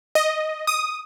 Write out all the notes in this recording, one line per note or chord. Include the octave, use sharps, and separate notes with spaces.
D#5
D#6